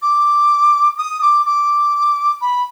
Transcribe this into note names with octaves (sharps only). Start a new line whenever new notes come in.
D6
D#6
D6
D6
B5